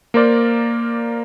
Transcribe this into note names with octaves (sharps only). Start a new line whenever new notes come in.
A#3 A#4 C5 D5